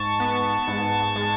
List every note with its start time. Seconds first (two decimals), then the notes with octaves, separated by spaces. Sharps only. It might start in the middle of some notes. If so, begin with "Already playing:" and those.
Already playing: G#2 A5 C#6
0.20 B3
0.67 G#2
1.16 G#3